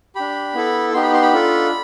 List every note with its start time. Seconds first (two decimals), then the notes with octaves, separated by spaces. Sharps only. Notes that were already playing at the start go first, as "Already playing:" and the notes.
0.16 D4 G4 B5
0.54 B3 E4 A4
0.94 B3 D#4 G4 C6
1.03 B5
1.14 C6
1.22 B5
1.33 D4 F4 A4